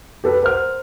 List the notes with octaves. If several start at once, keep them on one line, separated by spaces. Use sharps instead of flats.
G4 A4 B4
A#4 C5 F#5 F6